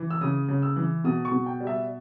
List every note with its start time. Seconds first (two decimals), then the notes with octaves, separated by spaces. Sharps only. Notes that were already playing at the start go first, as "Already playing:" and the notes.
Already playing: E3
0.11 E6
0.21 C#3 D#6
0.48 C#3
0.63 E6
0.76 E3
1.04 B2 D#6
1.25 C#6
1.32 B2
1.46 G5
1.60 G3
1.67 E5